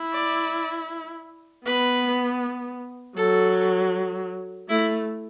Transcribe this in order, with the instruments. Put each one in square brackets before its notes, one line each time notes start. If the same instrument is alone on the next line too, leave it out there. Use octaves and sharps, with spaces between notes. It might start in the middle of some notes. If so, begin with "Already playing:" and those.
Already playing: [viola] E4
[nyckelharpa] D5
[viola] B3 [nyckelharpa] B4
[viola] F#3 [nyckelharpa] A4
[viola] A3 [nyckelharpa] E4